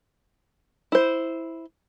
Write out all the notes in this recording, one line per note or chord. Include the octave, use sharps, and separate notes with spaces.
E4 C5